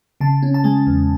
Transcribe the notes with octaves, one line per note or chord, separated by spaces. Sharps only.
C#3 A5
C#4
A5
G#3 G#5
E2